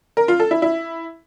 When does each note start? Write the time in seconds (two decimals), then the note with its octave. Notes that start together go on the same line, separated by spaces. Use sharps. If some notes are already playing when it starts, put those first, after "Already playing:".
0.17 A#4
0.28 F4
0.40 A4
0.51 E4
0.62 E4